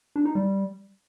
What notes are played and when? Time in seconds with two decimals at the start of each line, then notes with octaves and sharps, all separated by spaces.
0.16 D4
0.25 D#4
0.35 G3